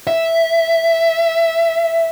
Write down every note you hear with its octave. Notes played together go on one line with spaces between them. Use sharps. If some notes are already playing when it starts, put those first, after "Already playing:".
E5